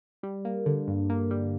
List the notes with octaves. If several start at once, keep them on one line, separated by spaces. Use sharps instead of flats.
G3
A#3
D3
G2
A#3
G3